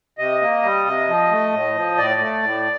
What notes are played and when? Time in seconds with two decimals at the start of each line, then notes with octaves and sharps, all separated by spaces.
0.18 C3 D#5
0.41 A#3
0.63 G3
0.85 C3
1.08 F3
1.31 A3
1.52 A2
1.75 F3
1.98 A2 D5
2.20 A3
2.43 A2